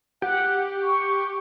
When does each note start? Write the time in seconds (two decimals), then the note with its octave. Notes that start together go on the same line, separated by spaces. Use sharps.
0.22 G4 F#5
0.82 C#6